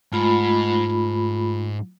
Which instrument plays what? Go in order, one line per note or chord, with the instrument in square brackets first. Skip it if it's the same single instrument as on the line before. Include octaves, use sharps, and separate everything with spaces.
[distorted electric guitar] G#2 [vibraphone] A3 F4 B5